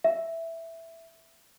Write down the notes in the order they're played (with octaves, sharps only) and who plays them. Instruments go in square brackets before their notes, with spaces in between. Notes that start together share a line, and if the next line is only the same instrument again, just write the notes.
[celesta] E5